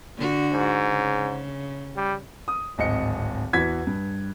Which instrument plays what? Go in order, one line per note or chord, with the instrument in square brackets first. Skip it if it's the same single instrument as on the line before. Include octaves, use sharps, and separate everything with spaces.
[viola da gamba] D3 F#4
[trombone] G#2
[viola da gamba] C#3
[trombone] G3
[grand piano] D#6
D1 G#1 D#5 C#7
E2 E3 F#4 G#6 B6
G2